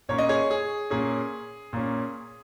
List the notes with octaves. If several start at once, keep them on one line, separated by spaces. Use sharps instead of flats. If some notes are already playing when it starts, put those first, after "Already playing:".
A#2 A#3 C#4 C#5
D#5
G#4 C#5
G#4
A#2 A#3 C#4 G#4
A#2 A#3 C#4